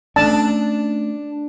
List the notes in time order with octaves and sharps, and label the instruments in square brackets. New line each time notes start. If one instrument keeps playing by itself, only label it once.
[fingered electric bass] A3 A#3 C#4 [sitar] D4 [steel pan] A5